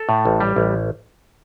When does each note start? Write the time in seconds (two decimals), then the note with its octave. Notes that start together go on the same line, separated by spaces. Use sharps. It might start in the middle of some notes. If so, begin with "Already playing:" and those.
Already playing: A4
0.09 A2
0.25 A1
0.40 G3
0.56 A1